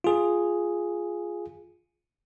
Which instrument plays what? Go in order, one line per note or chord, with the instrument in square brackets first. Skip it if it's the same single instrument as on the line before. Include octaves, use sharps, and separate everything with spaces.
[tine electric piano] F4 G#4